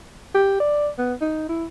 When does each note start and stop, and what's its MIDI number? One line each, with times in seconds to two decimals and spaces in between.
0.34 0.55 67
0.60 0.90 74
0.98 1.14 59
1.21 1.47 63
1.49 1.65 64